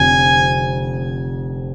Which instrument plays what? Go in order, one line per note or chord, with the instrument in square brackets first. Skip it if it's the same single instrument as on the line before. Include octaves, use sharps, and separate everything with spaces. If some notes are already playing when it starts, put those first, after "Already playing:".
Already playing: [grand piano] F1 F2 D3 [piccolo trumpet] G#5